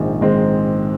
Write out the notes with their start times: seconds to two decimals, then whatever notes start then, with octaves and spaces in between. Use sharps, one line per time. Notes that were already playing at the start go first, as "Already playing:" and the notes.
Already playing: A#1 G#2 D#3 G#3 C4
0.21 G#2 D#3 G#3 C4